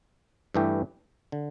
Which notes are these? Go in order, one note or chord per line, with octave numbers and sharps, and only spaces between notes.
G2 E3 A3 E4 G4
D3